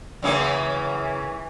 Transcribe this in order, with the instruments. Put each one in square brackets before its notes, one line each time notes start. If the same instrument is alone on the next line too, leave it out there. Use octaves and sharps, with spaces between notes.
[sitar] F#2 C#3 A#3 [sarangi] E3